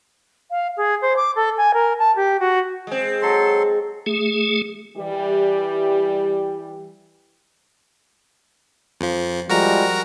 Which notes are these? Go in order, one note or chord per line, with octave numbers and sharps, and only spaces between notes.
F5
G#4
C5
D6
A4
G#5
A#4
A5
G4
F#4
G#3 C4
F#3 A4 C6
A3 G#4
E3 G3 G4
F2 F3
F3 G3 G#3 F#4 A#4 A#5